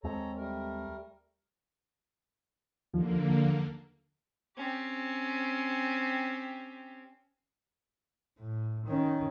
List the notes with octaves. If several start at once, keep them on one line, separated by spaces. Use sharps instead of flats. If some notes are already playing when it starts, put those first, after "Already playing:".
D#2 G#3 C4 A4 C#5 A#5
G3 A3 A#4
D#2 D3 F3 A#3
C4 C#4 G4
A2
D#3 C#4